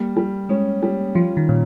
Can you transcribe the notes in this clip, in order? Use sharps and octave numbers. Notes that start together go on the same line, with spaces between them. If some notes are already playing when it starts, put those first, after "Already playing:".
Already playing: G3 A#3
G3
G#3 C#4
G3
F3 F4
D#3
A#2 C#4